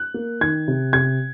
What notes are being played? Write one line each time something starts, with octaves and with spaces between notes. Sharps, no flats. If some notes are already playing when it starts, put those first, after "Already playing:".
Already playing: F#6
A#3
D#3 G#6
C3
C3 G#6